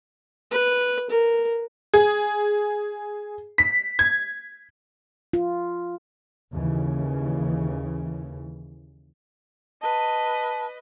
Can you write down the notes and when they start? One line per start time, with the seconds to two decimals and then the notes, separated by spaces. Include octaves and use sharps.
0.51 B4
1.10 A#4
1.94 G#4
3.58 B6
3.99 G#6
5.33 F4
6.53 D#2 C#3 E3
9.82 B4 D#5 A5